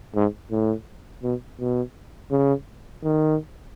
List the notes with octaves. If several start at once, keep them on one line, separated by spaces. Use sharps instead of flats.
G#2
A2
B2
B2
C#3
D#3